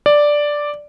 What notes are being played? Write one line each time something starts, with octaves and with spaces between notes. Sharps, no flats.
D5